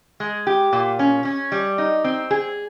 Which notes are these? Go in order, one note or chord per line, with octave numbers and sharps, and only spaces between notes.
G#3
G4
A#2
C#4
C#4
G3
D#4
C4
G#4